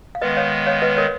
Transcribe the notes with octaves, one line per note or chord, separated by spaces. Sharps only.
F5
D#3 G#3 B3 B4 D#5
C#5 F5
C#5 F5
B4 D#5
A#4 C#5